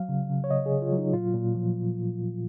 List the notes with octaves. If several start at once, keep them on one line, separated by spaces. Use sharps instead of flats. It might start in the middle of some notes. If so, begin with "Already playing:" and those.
Already playing: F#3 F5
C#3
C#3
C#5
C#3 D#5
G#4
C#3
F4
F#3
D#4
A#2 F4
A#2
F3